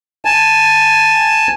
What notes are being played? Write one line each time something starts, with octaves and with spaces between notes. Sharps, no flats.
G#5 A5